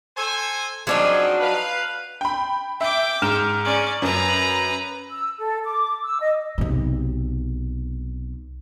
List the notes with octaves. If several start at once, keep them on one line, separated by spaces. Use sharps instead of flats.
A4 C5 G#5
F3 F#3 C4 D4 D#4 G#4
B4 F5
G5 B5
E5 G5 D6
G#2 F6 E7
C#4 D5
F#2 B4 A#5
E6
A4
D6
E6
D#5
B1 C3